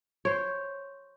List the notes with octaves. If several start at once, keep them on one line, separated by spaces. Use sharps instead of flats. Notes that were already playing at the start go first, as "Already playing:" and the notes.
C5 C#5